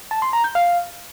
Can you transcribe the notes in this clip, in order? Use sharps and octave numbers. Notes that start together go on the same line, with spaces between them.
A5
C6
A#5
G6
F5